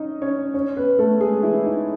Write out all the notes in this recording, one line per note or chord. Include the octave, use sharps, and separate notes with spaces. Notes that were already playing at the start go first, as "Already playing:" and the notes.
Already playing: C#4 D#4 D#5
C#4 C#5
C#4 C#5
B3 B4
A3 A4
G#3 G#4
E3 E4
D#4